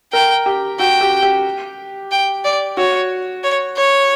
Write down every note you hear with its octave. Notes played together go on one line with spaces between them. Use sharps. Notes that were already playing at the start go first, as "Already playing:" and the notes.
A#4 G5
G4
F#4 G5
G4
G4
G5
D5
F#4 C#5
C#5
C#5